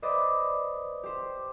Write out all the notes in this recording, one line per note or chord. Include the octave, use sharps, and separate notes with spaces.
B4 C5 D5 D#5 D#6 A6
G4 C5